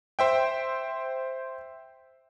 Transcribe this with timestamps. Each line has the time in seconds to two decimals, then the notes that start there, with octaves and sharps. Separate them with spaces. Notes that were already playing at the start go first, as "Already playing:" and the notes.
0.19 C5 E5 G5